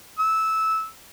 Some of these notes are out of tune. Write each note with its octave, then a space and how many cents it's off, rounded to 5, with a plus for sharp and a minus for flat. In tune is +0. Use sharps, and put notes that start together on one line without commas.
E6 -15